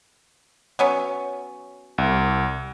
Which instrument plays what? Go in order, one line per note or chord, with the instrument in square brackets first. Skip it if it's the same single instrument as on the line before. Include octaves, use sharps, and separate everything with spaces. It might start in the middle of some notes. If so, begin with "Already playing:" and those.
[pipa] F#3 B3 C#4
[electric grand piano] C2